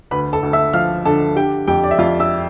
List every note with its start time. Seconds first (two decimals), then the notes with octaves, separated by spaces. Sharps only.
0.11 D2 B4 B5
0.33 A4 A5
0.43 D2
0.53 E5 E6
0.73 F3 F5 F6
1.05 D3 A4 A5
1.36 D3 G4 G5
1.68 F2 G4 G5
1.84 D5
1.91 E5
1.98 F2 F4 F5
2.19 E5 E6